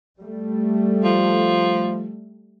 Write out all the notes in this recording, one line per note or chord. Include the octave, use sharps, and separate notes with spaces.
G3 A3
F3